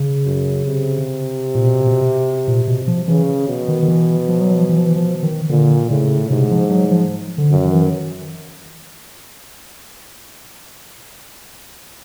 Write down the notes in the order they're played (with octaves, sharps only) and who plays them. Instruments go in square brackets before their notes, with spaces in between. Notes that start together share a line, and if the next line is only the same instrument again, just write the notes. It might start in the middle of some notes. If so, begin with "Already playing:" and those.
Already playing: [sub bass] C#3
[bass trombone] F#2
C3
[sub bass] A#2
B2
B2
A#2
B2
F3
[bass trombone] C#3 [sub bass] E3
[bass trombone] B2
[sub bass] D#3
D#3
E3
F3
F#3
F3
E3
F3
E3
F3
D#3
[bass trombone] A#2 [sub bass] D3
[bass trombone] A2 [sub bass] C#3
[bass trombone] G#2 [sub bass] C3
[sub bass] F3
F#3
F3
D3
[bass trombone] F#2
[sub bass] D#3
E3
D#3